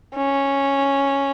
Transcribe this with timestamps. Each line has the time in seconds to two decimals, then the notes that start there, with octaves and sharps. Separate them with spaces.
0.16 C#4